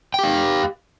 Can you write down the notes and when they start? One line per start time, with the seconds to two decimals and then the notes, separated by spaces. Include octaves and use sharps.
0.14 G5
0.19 G4
0.23 F5